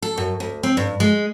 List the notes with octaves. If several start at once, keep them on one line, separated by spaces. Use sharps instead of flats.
A4
F#2
D2
C4
G2
G#3